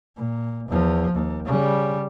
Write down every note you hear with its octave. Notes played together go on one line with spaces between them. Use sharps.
A#2
E2 F3
D#2
C#3 G3